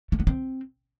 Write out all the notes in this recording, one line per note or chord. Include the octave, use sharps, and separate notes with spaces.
A3
B3
C4